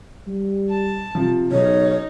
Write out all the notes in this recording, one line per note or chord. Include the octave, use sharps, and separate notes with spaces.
G3
A5
C3 F3
B1 C#3 D#4 C#5